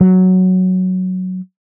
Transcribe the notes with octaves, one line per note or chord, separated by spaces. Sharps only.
F#3